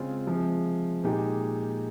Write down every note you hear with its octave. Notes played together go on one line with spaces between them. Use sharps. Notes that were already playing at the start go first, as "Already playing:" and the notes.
Already playing: C#3 G#3 C4 F4
C3 F3 G#3
A#2 G#3 D#4 G4